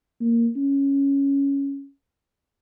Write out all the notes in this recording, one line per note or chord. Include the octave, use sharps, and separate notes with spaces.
A#3
C#4